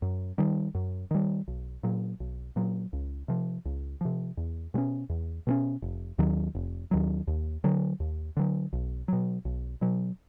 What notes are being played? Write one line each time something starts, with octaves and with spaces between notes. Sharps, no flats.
F#2
D#3 G3
F#2
D#3 G3
B1
A#2 F#3
B1
A#2 F#3
C#2
C3 F3
C#2
C3 F3
E2
B2 G#3 C#4
E2
B2 G#3 C#4
F1
D#2 D#3 F#3
F1
D#2 D#3 F#3
D#2
D3 F#3
D#2
D3 F#3
B1
B2 F#3
B1
B2 F#3